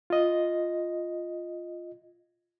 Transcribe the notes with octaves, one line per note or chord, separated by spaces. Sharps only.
F4 D#5